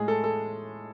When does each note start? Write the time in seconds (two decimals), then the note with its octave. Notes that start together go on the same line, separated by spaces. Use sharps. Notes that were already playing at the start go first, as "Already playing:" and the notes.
Already playing: A2 G#3 G#4
0.08 A4
0.24 A4